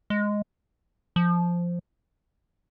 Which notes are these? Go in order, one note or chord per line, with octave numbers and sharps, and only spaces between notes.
G#3
F3